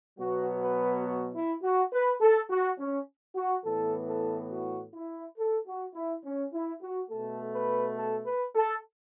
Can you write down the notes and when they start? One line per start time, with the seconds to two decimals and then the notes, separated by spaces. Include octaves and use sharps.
0.19 B2 F#3 B3 F#4
0.63 B4
1.06 F#4
1.34 E4
1.63 F#4
1.92 B4
2.21 A4
2.50 F#4
2.79 C#4
3.35 F#4
3.65 A2 E3 B3 A4
4.08 A4
4.51 F#4
4.94 E4
5.38 A4
5.66 F#4
5.95 E4
6.24 C#4
6.53 E4
6.82 F#4
7.10 B2 A3 A4
7.54 B4
7.97 A4
8.26 B4
8.55 A4